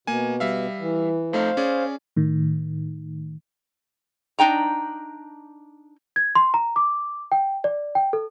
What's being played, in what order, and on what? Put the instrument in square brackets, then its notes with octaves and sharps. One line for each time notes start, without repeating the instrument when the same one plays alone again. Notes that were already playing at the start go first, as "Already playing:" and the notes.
[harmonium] B2 [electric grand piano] A#3 G#5
[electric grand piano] G3 E5 F5
[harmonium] E3
[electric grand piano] F2 A3 D#4 [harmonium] C5 F5
[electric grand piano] C#4 G#4 D5
[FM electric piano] A2 D#3
[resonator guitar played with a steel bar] D4 D#4 G5 A#5
[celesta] G#6
C6
A#5
D6
G5
D5
G5
A4